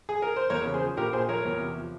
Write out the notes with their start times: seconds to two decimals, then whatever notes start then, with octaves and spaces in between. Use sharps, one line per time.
0.09 G#4
0.22 A#4
0.36 C5
0.50 E2 A#4 C#5
0.66 C#3
0.74 G#4 C5
0.81 F3
0.97 A#1 G4 A#4
1.13 A#2 G#4 C5
1.29 F3 A#4 C#5
1.45 E2
1.61 C3
1.77 F3